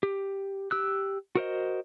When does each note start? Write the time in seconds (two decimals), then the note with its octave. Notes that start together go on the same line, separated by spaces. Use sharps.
0.03 G4
0.71 G4 E6 F#6
1.35 F#4 A#4 C5 D#5